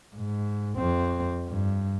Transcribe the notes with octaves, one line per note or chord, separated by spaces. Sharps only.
G#2
F2 C4
G2